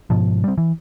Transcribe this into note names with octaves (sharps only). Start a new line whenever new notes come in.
G#2 B2 F3
G3 C4
E3